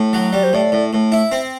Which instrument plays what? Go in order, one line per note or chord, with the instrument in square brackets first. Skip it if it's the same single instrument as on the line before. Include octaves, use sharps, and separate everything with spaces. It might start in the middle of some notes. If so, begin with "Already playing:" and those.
Already playing: [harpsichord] A2
F#3
[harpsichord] G3 [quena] D5
[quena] C5
[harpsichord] A2 [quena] D5
[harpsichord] A2
A2
E4
C4